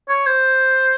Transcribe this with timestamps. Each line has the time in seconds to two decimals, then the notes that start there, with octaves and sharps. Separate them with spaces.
0.09 C#5
0.27 C5